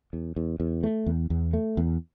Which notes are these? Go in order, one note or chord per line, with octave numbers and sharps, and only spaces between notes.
E2
E2
E2
A3
E2
E2
A3
E2